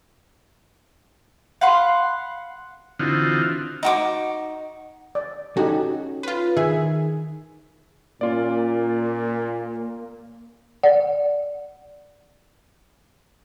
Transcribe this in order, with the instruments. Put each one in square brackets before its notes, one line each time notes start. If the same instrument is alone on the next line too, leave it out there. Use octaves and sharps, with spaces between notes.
[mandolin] F5 F#5 B5 C6
[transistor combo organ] D3 E3 C4 D#4 F4 F#4
[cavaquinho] D#4 F#4 D6
[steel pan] D5
[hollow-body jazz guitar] C#4 A4 [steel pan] D#4 G4 [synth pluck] F#4
[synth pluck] F4 B4
[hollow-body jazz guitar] D#3 [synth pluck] G#4 [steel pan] E5
[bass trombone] A#2 [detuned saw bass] A#3 [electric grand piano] C#4 F4 D5
[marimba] D5 F#5